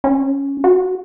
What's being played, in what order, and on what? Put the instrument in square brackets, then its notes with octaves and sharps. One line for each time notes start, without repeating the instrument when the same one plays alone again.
[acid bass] C#4
F#4